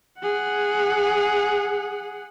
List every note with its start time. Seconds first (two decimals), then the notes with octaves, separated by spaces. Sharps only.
0.20 G#4 F#5